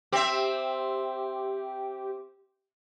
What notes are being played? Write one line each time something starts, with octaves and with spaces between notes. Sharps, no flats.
C4 G4 E5